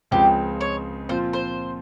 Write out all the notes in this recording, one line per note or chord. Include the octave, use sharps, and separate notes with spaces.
C#2 C#3 F3 G#3 C4 G4
C#5
A#2 F3 C4 F4 C5
C5